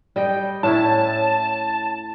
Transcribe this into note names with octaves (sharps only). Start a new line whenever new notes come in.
G3 D#5 G5
A2 C#4 E4 A5